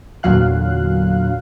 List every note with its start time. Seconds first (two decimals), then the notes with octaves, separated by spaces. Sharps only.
0.23 E2 A#2 D3 F#3 F5 F#6